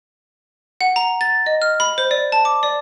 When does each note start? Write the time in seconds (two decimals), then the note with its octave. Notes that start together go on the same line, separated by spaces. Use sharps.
0.81 F#5
0.96 A#5
1.21 A6
1.46 D#5
1.62 F6
1.80 B5
1.98 C5
2.11 D5
2.32 A5
2.45 D6
2.63 D5